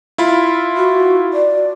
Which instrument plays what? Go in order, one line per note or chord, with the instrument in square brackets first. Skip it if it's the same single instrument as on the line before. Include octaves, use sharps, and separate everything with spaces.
[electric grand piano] E4 F4 B5
[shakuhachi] F#4
D5